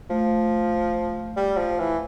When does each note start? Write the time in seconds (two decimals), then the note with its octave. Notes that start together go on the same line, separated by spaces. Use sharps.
0.10 F3 A3
1.36 G3
1.57 F3
1.79 E3